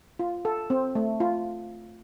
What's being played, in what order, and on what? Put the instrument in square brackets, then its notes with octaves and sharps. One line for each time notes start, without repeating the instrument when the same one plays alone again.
[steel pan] F4
A4
C4
A3
F4